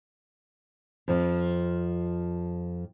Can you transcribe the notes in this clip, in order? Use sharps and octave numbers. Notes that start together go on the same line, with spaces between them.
F2 F3